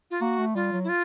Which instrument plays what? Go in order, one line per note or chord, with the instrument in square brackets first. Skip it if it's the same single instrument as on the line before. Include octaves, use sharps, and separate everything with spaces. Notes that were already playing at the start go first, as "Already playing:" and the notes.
[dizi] F4
[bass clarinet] A#3 [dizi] F#4
[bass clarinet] A3
[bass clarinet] G3 [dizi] F4
[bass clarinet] F#3
[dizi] E4
F4